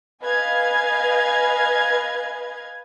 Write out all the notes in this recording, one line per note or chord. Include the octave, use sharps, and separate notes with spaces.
B4 D#5 F5 G#5 G#6